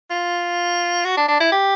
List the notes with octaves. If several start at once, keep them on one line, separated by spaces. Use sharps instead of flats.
F4
F#4
D4
D4
E4
G4